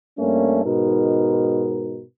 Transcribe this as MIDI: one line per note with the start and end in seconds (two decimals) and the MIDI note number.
0.18 0.62 43
0.18 0.62 57
0.18 0.62 58
0.18 0.62 61
0.64 2.02 44
0.64 2.02 47
0.64 2.02 63
0.64 2.02 70